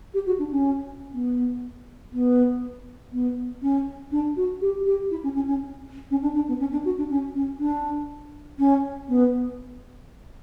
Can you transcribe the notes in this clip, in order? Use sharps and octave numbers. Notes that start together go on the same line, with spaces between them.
G4
F#4
D4
C#4
B3
B3
B3
C#4
D4
F#4
G4
G4
E4
C#4
C#4
C#4
C#4
D4
D4
B3
C#4
D4
F#4
D4
C#4
C#4
D4
C#4
B3